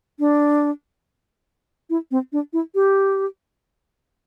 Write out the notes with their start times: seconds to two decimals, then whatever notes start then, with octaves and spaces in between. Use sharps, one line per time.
0.19 D4
1.90 E4
2.11 C4
2.33 D4
2.53 E4
2.75 G4